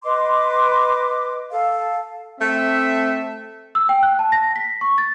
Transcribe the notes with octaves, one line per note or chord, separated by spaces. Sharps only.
B4 D#5 C6 D6
A4 F5
A3 C4 E5
E6
G5
F#6
A5
A#6
B6
C#6
A6